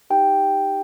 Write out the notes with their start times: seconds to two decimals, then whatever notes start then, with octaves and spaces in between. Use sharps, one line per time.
0.10 D#4 G4 G5